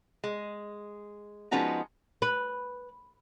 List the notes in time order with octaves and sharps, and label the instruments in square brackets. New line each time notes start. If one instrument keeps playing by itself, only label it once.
[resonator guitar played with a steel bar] G#3
F3 G#3 B3 C#4 D#4 F#4
[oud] B4